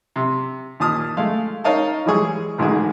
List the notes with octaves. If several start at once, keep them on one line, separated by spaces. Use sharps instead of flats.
C3
D#2 A#2 A5 D#6 F6
G#3 A3 F5
D#4 A#4 C#5 D#5 F5 A5
E3 G3 G#3 G#4 C#6
A1 D2 G#2 D#3 G#4